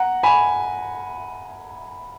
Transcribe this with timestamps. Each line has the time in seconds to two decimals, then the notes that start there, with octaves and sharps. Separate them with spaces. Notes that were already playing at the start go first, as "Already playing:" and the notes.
Already playing: F#5 A#5
0.23 G#5 B5